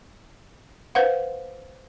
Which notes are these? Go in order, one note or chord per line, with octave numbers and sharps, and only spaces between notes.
B4 C5 F5 F#5